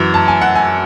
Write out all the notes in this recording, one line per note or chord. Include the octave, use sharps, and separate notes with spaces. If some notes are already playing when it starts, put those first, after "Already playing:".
Already playing: F#2 E3
A5
G#5
F#5
G#5